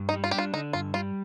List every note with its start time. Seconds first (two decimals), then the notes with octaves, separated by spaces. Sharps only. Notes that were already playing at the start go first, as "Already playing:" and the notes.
Already playing: G2
0.09 D#4
0.14 G3
0.24 F4
0.31 G4
0.34 D4 F4
0.54 D3 D#4
0.73 G2 F4
0.94 G3 F4